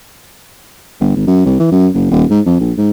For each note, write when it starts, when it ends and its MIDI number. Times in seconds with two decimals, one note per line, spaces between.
1.00 1.12 31
1.15 1.24 32
1.27 1.43 42
1.45 1.55 36
1.60 1.69 52
1.71 1.88 42
1.94 2.09 30
2.11 2.24 27
2.30 2.40 44
2.46 2.55 41
2.60 2.72 34
2.78 2.91 44